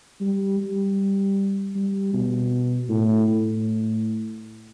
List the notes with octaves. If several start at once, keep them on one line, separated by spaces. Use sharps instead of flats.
G3
G3
G3
B2
A2
A2